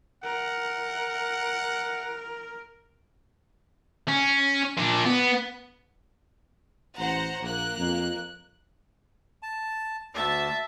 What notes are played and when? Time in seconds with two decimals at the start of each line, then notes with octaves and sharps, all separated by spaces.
0.24 A#4 F#5
4.08 C#4
4.78 A#2 D4
5.06 B3
6.97 A1 C5 F#5 A#5
7.41 A#1 A#3 F#6
7.78 F2
9.43 A5
10.15 D2 E5 A5